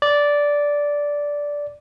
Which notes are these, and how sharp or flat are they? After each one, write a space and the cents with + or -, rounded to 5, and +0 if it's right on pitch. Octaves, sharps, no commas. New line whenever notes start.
D5 -10